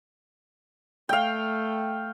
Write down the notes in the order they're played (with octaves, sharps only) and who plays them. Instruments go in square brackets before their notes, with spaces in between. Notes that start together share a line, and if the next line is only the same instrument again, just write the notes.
[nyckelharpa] A3 [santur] F5 G5